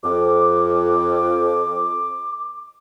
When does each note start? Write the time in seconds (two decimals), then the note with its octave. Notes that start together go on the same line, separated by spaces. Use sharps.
0.04 F2 D6